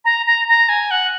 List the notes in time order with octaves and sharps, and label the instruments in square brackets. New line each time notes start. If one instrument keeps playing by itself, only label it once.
[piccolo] A#5
A#5
A#5
G#5
F#5